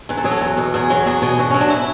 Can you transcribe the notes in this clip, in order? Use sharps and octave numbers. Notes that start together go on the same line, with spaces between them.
E2 B4
A4
F#3 G#4
A4
E2 B4
B2
E2 G#4
F#3
E2 G#4
B2
E2 F#4
F#3 C#4
D4
E4